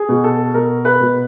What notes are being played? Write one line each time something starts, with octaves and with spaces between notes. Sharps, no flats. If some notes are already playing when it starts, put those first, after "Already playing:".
Already playing: G#4
B2
A4
B2 A#4
B4
B2